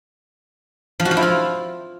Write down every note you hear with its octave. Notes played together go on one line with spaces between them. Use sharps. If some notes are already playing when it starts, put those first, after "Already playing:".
F3
F#4
F3
E4
F4